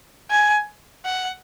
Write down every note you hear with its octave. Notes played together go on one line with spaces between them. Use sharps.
G#5
F#5